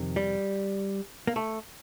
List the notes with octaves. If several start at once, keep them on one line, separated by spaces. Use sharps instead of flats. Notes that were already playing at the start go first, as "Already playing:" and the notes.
Already playing: F2 C3 D#3
G3
A#3
A3